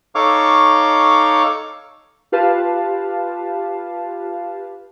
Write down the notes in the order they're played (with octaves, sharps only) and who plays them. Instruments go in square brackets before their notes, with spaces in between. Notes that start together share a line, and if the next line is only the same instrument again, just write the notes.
[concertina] D#4 A4 C#5 F5 C#6 D6
[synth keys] F4 G4 B4 F5 A5